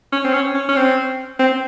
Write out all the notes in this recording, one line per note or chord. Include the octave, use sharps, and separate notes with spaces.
C#4
C4
C#4
C#4
C#4
C4
C4